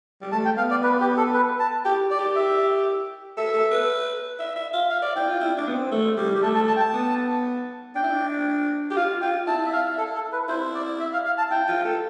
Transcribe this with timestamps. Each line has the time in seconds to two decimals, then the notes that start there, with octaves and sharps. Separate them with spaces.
0.21 G3
0.32 A3 A5
0.45 G5
0.57 B3 F5
0.71 D5
0.83 B4
1.01 G4
1.17 A4
1.34 B4
1.60 A5
1.85 G4 G5
2.11 D5
2.19 G4
2.36 E5
3.37 A4 E5
3.54 A4
3.71 B4
4.39 E5
4.56 E5
4.73 F5
4.90 E5 F5
5.02 D5
5.16 E4 G5
5.28 F4
5.40 E4
5.58 D4
5.68 B3
5.75 C4
5.92 A3
6.17 G3
6.36 G3
6.42 A3 A5
6.55 A5
6.68 A5
6.76 G5
6.80 A5
6.93 B3
7.95 D4 G5
8.03 E4
8.11 D4
8.91 G4
8.96 F4 F5
9.22 F4 G5
9.47 E4 A5
9.66 E5
9.73 F5
9.98 A4
10.15 A4
10.32 B4
10.49 E4 C5
10.74 D5
11.00 E5
11.13 F5
11.25 F5
11.38 A5
11.51 E4 G5
11.68 F4
11.85 A4